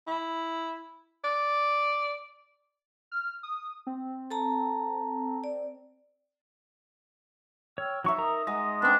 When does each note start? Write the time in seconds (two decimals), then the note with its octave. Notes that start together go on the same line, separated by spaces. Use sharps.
0.07 E4
1.24 D5
3.12 F6
3.43 D#6
3.87 C4
4.31 A4 A5 A#5
5.44 D5
7.78 C#5 G5 E6 F6
8.04 F#3 D#4 D#5 E5 C#6
8.18 A#4 A#5 D#6
8.47 G#3 D#5 F#5
8.82 B3 C4 D4